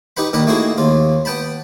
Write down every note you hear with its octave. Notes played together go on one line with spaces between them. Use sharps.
D#4 G4 B4 F#5 B5
A#2 D#3 D4 F#5 B5
A3 A#3 D#4 E4 F#4 G#4
D#2 F4
B3 F#5 G5 A5 B5